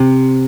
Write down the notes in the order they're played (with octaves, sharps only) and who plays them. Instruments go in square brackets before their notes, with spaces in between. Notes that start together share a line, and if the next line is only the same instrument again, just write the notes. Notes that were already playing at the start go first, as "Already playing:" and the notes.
Already playing: [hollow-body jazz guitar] C3